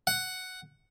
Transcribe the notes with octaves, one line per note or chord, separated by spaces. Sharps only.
F#5